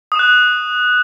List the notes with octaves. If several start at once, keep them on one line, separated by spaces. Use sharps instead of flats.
D#6 F#6 E7